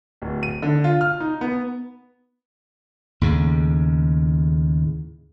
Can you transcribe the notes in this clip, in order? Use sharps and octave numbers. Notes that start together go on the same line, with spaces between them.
D1
D#7
D3
F4
F6
D#4
B3
D#2 A2 C#3